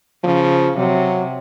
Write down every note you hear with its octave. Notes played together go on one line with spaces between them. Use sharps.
C#3 F3
C3 F#3